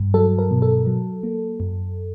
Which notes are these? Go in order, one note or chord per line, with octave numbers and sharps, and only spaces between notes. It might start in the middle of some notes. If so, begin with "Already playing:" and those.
Already playing: G2
F#3 A4
A#4
B2
A4
F#3
A#3
F#2